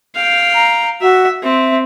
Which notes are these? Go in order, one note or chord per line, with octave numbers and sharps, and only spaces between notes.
F5 G5
A#5
F#4 E5
C4 E5